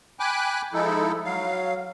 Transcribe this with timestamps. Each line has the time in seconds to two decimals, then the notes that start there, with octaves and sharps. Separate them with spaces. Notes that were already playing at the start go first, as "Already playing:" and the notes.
0.20 G5 G#5 B5 D6 F#6
0.74 F3 G#3 D#4 E4 A4
1.25 F#3 F5